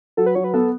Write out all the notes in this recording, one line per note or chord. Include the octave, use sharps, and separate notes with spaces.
F#3 A4
B4
F#3 C#5
B4
B3 A4